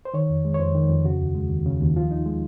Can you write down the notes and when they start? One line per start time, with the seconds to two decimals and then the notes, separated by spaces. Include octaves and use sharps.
0.05 C5
0.14 D#3 C#5
0.30 F2
0.45 G#3
0.54 C#5
0.59 F2 C5
0.75 D#3
0.89 F2
1.04 C#3 F#4
1.20 D#2
1.35 G#3
1.50 D#2
1.66 C#3
1.81 D#2
1.96 F3 F4
2.11 D#4
2.26 G#3